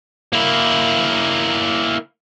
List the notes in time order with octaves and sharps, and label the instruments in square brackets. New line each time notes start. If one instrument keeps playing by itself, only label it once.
[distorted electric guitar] A#3 E4